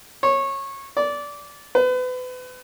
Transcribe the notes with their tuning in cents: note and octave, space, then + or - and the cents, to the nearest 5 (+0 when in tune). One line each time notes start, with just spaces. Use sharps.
C#5 -20
D5 -20
B4 +35